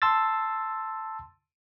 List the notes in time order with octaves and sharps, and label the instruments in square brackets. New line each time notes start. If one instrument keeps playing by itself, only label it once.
[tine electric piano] A5 C6 E6 A6